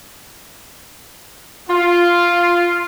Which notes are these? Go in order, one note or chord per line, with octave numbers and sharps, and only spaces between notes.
F4